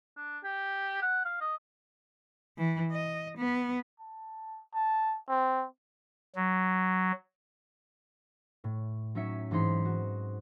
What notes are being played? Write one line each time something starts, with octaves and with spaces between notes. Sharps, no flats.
D4
G4
F#5
F5
D#5
E3
D#5
B3
A5
A5
C4
F#3
A2
F#3 C#4 D#4 E5 B6 C#7
G#2 E3 C4 D#4 C6 B6
F#4